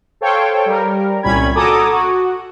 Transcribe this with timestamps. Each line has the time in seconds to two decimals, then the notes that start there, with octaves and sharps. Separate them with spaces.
0.21 A4 C5 C#5 F5 G5
0.66 G3 A#4
1.23 C2 A#2 G3 C#4 B5 G#6
1.55 F#4 A4 G#5 A#5 D6 D#6
1.92 F#4